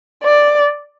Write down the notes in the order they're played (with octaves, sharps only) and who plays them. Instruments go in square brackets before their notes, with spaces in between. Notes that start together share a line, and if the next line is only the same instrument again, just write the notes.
[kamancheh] D5